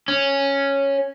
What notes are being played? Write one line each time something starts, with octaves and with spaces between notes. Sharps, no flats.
C#4